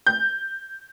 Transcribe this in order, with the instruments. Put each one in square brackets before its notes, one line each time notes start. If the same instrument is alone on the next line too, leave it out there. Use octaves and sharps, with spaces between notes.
[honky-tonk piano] G6